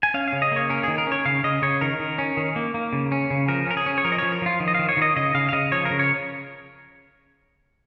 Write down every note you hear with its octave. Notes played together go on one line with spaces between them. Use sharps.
G#5
C#4 F5
F5
C#3
D#5
A#3 C#5
C#4 A#4
D#3 G#4
A#4
C#4 C#5
C#3 F5
C#3 D#5
C#3 C#5
D#3 A#4
D#3
C#4
D#3
A#3
A#3
C#3
C#4
C#3
F3 A#4
C#4 A#4
G#4
C#4
C#5
F3 A#4
D#5
F3 C#5
A#4
F3 F4
D#3
D#5
D#3 F5
C#5
D#3 D#5
C#3 D#5
C#3 F5
F5
C#3 D#5
F3 C#5
A#4
C#3
C#5